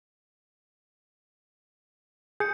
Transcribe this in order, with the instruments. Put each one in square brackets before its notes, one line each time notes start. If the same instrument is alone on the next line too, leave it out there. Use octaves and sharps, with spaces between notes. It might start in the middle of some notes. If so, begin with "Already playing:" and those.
[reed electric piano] G#4 [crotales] G6 C#7